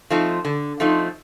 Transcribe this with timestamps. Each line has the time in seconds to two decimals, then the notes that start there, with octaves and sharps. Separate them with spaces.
0.10 F3 A3 C4 D#4
0.45 D3
0.80 F3 A3 C4 D#4